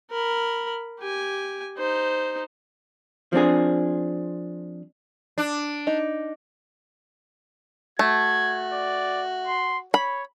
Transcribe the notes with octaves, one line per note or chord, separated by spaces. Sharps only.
A#4 B5
G4 G#5
D#4 C5
F3 C4 D4 G#4
D4
D#4
A3 F#4 G#6
D5
C6
C#5 B5